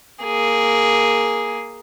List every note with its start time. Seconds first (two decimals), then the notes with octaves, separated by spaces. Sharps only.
0.24 A#3 G#4